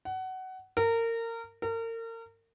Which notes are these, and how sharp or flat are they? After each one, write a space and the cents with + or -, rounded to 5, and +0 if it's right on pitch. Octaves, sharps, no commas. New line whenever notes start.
F#5 +20
A#4 -25
A#4 -35